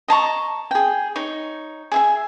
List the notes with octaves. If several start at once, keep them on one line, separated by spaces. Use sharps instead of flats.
D#5 A5 A#5 C#6
G#4 G5
D#4 C#5
G#4 E5 G#5